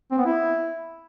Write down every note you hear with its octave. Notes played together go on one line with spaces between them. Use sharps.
C4
B3
E4